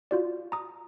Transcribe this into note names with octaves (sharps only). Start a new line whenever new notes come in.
F4 F#4 D5
A#5 D#6